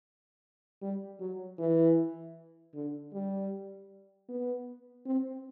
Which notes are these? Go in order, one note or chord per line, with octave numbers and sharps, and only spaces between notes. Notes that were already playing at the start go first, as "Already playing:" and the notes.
G3
F#3
E3
D3
G3
B3
C4